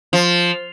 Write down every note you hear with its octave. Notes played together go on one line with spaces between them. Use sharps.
F3